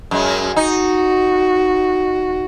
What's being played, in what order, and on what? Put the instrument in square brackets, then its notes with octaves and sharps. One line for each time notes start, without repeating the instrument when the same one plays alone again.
[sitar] F#2 G#3
[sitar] D#4 [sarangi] F#4